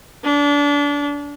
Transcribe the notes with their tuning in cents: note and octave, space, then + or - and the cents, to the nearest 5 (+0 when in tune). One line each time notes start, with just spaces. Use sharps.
D4 -30